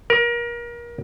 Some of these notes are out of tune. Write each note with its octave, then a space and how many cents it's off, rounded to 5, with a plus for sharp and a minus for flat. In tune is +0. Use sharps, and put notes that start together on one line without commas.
A#4 +30